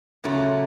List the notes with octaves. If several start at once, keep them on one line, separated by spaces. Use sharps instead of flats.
A#2 C#3 F#3 A3